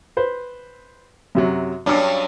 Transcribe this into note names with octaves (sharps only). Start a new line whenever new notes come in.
B4 C5
F#2 C3 F#3
G2 F#3 C#4 D4 D6